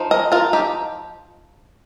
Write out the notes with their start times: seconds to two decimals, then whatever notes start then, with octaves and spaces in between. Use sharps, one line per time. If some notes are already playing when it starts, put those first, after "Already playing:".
Already playing: F3 D#4
0.11 A#4 D#5
0.32 F4 A#4
0.53 D#4 G4